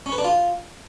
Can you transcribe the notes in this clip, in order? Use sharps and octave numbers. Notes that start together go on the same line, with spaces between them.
C#4
B4
D4
F4